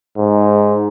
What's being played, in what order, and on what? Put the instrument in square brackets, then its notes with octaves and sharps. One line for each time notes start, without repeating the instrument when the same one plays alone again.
[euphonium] G#2